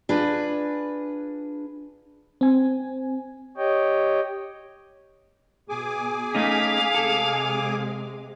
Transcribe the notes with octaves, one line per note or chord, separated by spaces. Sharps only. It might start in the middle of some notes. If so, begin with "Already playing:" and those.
D4 F4 G#4 B4
C4 G#5
G4 C#5 D#5 G5
B2 G#4 G#5 D6
A3 C#4 D#4 F5 B6
C3 G#3 A4